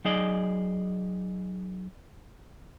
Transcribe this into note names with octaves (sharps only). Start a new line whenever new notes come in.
F#3 D#4 G#4 D5 D#5